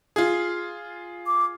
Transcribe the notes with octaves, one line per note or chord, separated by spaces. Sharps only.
F4 G#4
D6